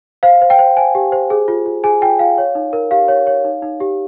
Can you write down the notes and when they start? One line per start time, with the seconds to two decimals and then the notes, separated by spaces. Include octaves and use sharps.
0.23 C5 F5
0.42 C5
0.50 G5
0.59 C5
0.77 C5 G#5
0.95 G4
1.12 C5
1.30 G#4
1.48 F4
1.66 F4
1.84 G#4 G#5
2.02 F4 G5
2.19 F4 F5
2.38 C#5
2.55 D#4
2.73 A#4
2.91 G4 F5
3.08 C#5
3.27 C#5
3.44 D#4
3.62 D#4
3.80 G4